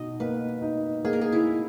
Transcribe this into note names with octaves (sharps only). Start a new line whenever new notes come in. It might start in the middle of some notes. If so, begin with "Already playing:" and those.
Already playing: B2 D#4 D#5
A#3 B4
D#4
A#3 G#4
A#4
G#4
E4